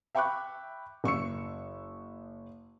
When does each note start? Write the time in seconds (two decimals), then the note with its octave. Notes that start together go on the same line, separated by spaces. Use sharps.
0.15 E5 G5 B5 C#6 D6 F#6
1.04 F#1 C#6 E6 C#7